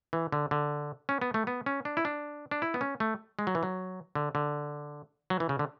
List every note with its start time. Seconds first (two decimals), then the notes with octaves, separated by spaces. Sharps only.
0.13 E3
0.32 D3
0.51 D3
1.09 C#4
1.22 B3
1.34 A3
1.47 B3
1.66 C#4
1.85 D4
1.97 E4
2.05 D4
2.51 D4
2.62 E4
2.74 B3
2.81 C#4
3.00 A3
3.39 G#3
3.47 F#3
3.55 E3
3.63 F#3
4.15 D3
4.35 D3
5.30 F#3
5.40 E3
5.49 C#3
5.59 D3